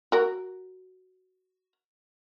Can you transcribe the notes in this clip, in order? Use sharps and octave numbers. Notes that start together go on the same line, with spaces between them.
F#4 A#4